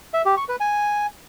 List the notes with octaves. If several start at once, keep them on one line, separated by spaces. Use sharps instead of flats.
E5
G4
C#6
B4
G#5